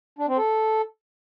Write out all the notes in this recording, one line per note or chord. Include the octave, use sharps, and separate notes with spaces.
D4
C4
A4